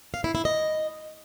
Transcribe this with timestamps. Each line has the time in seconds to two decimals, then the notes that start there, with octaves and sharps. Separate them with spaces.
0.14 F5
0.24 E4
0.35 E4
0.45 D#5